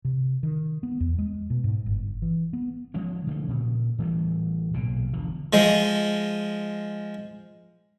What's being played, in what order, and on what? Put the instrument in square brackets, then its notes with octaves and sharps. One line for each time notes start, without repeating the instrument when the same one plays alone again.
[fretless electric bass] C3
D#3
B3
E2
G#3
B2
G#2
G1
E3
B3
[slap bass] F3 G#3 C#4
D3 F3 A3
A#2 C#3
A2 E3 G3 A3
B1 A#2 C#3
E1 D3 F3
[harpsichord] F3 G#3 D#5